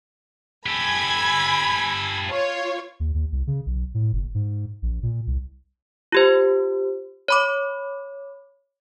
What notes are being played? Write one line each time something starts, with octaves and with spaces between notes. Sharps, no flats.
G4 A4 G#5 B5 G#6
F4 C#5
D#2
D#2
C2
C#3
B1
A2
F#1
G#2
A#1
A#2
C2
F4 G4 C5
C#5 B5 D6